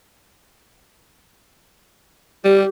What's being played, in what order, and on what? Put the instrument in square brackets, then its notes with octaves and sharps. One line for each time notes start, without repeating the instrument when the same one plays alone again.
[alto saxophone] G3 [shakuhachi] G4